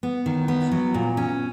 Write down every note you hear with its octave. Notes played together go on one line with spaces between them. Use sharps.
B3
D#3
B3
F#3
A#2
C#4